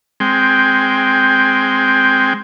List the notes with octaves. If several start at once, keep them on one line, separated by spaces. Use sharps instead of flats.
G#3 C4 G5